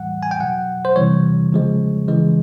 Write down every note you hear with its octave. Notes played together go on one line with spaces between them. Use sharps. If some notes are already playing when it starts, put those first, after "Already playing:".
Already playing: A2 E3 G3 F#5
G#5
G5
B2 F#3 F#5
C5
C3 E3 G3 C#5
C#3 F3 G#3
C#3 E3 G#3